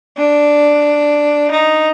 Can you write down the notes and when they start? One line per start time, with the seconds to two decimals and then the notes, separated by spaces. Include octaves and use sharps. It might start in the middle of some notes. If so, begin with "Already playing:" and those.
0.18 D4
1.51 D#4